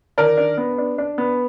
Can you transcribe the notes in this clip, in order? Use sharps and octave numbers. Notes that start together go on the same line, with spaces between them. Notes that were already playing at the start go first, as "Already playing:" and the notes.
D#3 A#4 D5
D4
B3
D4
D4
B3